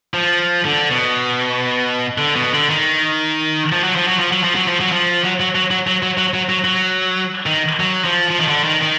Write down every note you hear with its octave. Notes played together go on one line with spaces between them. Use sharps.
F3
D3
B2
D3
B2
D3
D#3
F3
F#3
F3
F#3
F3
F#3
F3
F#3
F3
F#3
F3
F#3
F#3
F#3
F#3
F#3
F#3
F#3
F#3
F#3
F#3
D#3
F#3
F3
F3
D#3
D3
D#3
D#3